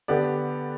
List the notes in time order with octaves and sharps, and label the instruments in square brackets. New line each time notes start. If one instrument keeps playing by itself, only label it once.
[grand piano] D3 B3 G4 D5